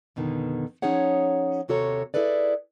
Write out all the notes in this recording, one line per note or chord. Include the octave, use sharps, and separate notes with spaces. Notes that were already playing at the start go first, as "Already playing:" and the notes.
F2 B2 D3 D#3
F3 C#4 D#4 G#4 C#5 F#5
D#2 C3 F#4 A4 C#5 A#5
E4 G#4 A4 B4 D5